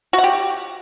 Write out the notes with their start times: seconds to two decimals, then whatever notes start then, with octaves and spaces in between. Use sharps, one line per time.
0.13 F#4
0.18 F#5
0.24 G4